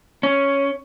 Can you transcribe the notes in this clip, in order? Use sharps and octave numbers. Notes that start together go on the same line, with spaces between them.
C#4